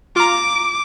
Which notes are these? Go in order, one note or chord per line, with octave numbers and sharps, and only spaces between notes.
F4 A#5 D6